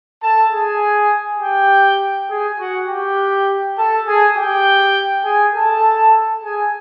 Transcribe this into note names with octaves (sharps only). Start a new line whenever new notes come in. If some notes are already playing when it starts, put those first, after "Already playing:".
A4 A5
G#4 G#5
G4 G5
G#4 G#5
F#4 F#5
G4 G5
A4 A5
G#4 G#5
G4 G5
G#4 G#5
A4 A5
G#4 G#5